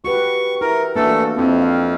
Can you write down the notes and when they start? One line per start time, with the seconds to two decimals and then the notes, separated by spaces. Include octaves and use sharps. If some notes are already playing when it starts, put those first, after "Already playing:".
0.04 F#4 G4 B4 C#6
0.61 E4 A#4
0.96 E3 A3 A#3 D4 F#4 A4
1.37 F2 C4 E4
1.62 F5